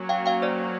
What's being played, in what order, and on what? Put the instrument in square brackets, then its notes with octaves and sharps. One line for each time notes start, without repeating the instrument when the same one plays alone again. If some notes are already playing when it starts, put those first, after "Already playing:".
Already playing: [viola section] F#3 A#3 C#4 F#4
[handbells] F5 G5
F5 G5
C5 D5